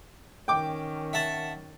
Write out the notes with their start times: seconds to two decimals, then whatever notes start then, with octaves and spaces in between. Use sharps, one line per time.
0.48 D#3 C#4 G5 D6
1.13 E5 F#5 A5